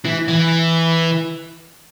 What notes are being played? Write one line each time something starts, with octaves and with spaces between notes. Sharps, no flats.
E3
E3